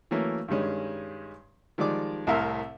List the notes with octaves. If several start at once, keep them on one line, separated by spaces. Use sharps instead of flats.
E3 F#3 A3 A#3 C#4
G2 D#3 G3 G#3 C#4
D#3 F3 G3 G#3 D5 D6
C2 A2 C3 A#4 E5 F5